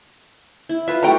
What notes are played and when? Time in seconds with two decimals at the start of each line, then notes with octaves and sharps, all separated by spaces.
0.69 E4
0.88 F4 B4 E5
1.03 A3 F#4 G4 G5 A#5